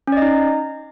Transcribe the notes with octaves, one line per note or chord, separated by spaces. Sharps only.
C#4 D#4 D5 D#5